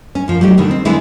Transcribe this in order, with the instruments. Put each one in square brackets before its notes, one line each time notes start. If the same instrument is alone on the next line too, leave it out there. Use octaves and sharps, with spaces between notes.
[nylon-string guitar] C#4
F#2 F3
F#3 A3 D#4 G4
B2 D3 D#3 G3
C4
D3 G#3 B3 D4 E4